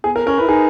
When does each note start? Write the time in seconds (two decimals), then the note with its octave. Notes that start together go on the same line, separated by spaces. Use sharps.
0.04 B3 G#4
0.16 A#4
0.27 C#4 A#4
0.38 B4
0.41 E4
0.48 D#4 G#4